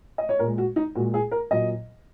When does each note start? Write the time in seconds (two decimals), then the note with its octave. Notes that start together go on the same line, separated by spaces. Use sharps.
0.18 D#5
0.29 C#5
0.39 A#2 G#3 A#4
0.58 F#4
0.76 D#4
0.95 A#2 G#3 F#4
1.14 G#4
1.31 A#4
1.51 A#2 F#3 D#5